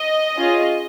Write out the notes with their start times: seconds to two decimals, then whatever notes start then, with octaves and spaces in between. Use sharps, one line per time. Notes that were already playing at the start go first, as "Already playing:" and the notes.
Already playing: D#5
0.37 C#4 F4 G#4